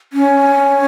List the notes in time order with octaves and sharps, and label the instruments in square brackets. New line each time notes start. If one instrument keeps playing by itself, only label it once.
[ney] C#4